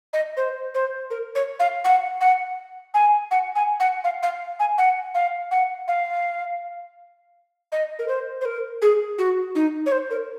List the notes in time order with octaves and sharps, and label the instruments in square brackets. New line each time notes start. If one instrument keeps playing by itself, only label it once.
[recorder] D#5
C5
C5
A#4
C#5
F5
F#5
F#5
G#5
F#5
G#5
F#5
F5
F5
G#5
F#5
F5
F#5
F5
D#5
A#4
C5
C5
A#4
G#4
F#4
D#4
C#5
C5
A#4